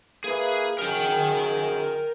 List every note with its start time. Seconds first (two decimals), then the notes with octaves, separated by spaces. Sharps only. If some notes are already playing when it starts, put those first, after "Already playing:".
0.24 A#3 E4 G#4 B4
0.79 F#2 D#4 G#4 A#4 G5